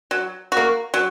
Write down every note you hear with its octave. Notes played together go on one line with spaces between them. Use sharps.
F#3
A#3 F#4
F#3